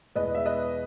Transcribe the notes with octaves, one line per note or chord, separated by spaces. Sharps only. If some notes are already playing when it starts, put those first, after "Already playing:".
E2 B2 G#3 B4 D#5
E5
B4 D#5